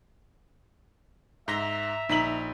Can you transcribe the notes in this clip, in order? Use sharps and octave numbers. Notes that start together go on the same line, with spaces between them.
G#2 E5 A#5 A#6 B6 G7
A#1 D#4 A#5 B6 F#7